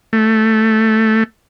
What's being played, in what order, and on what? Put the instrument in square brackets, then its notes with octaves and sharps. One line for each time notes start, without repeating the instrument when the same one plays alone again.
[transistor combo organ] A3